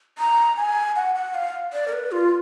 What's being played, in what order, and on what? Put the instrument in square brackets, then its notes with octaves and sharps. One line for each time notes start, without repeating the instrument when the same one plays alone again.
[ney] A#5
G#5
F#5
F#5
F5
D5
A#4
B4
F4